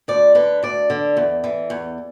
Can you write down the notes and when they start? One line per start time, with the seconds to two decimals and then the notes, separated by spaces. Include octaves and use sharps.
0.08 D2 D5
0.35 D3 B4
0.63 D2 D5
0.90 D3
1.17 E2
1.44 E3
1.70 E2